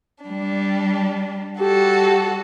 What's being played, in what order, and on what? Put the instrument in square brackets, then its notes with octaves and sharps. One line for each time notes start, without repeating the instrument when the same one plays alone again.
[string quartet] G3 D4
[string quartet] G3 F#4 A4 [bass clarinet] G4